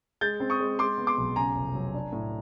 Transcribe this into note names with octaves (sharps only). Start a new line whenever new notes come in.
G#3 G6 A6
C4
C#6 D#6
G#3
G#3 C6 D6
B3
C6 D6
B1
C#3 G#5 A#5
F1
F#3
D4
A2